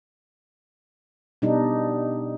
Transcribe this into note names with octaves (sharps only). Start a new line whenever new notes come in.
B2 G3 D4 D#4